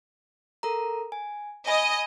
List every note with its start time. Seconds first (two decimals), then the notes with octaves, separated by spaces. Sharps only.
0.63 A4 A#4 A#5
1.12 G#5
1.67 D#5 G#5 B5 G#6